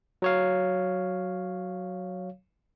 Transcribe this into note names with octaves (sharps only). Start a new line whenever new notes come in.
F#3 C#5 F5